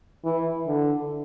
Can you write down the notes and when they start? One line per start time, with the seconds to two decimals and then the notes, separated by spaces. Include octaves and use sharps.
0.25 E3
0.67 D3